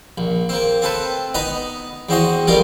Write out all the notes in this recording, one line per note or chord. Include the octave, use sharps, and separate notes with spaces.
A#1
A#3 C4
C4 A4 B4
B3 D#4 B4 D#5
E2 C4 F#4 D#5
F2 G3 D#4 F4 A#4 G#5